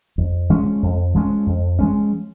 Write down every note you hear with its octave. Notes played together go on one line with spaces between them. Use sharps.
F2
F3 G#3 C#4
F2
F3 G#3 C#4
F2
F3 G#3 C#4